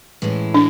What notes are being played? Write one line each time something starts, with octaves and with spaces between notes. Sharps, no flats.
A2 E3 G#3 C#4 E4
D4